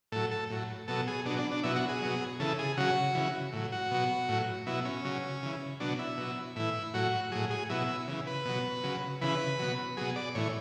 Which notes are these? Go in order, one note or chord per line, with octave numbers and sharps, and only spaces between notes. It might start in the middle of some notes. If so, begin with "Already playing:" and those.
A2 F#3 A4
A4
A2 F#3
B2 F#3 A4
G#4
B2 D4
F#3
D4
D4
B2 F#3 E4
F#4
G#4
B2 F#3
C#3 E3 A4
G#4
C#3 F#3 F#4
C#3 E3
A2 F#3
F#4
B2 F#3
A2 F#3
B2 F#3 E4
C#4
C#3 F#3
C#3 E3
B2 F#3 D4
E4
B2 F#3
A2 E3 E4
A2 F#3 F#4
A2 F#3 G#4
G#4
B2 F#3 E4
C#3 E3
B4
B2 F#3
C#3 F#3
C#3 E3 B4
B2 F#3
B2 F#3 G#4
D5
A2 E3 C#5